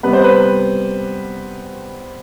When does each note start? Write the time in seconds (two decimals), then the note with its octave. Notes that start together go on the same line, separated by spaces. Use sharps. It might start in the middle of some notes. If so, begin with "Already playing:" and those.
0.03 C3 G3 B3 B4
0.13 C5
0.24 B4